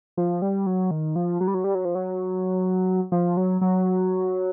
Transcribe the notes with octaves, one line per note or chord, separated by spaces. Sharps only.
F3
G3
F#3
D#3
F3
F#3
G3
F#3
G3
F#3
F3
F#3
F3
F#3
F#3